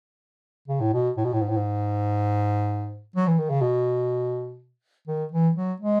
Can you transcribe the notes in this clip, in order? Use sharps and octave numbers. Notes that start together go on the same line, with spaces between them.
C#3
A2
B2
A2
B2
A2
G#2
A2
G#2
F#3
E3
D#3
C#3
B2
D#3
E3
F#3
G#3